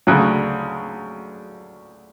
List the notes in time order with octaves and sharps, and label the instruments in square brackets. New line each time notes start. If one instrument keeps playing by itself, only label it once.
[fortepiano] D2 C#3 F#3